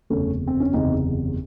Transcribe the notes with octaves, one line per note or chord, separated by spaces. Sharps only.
F#1 E2 C3 A3 C#4
C4
C#4
F#1 E2 C3 C4 D#4